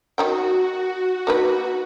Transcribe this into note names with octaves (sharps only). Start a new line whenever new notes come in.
D#3 D#4 F#4 G5
A#3 D#4 B4